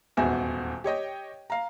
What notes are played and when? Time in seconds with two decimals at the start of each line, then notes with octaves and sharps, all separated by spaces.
0.17 D#1 E2 G#2 F#4 E5 G#5
0.84 G4 C#5 D#5 G5
1.50 F5 A#5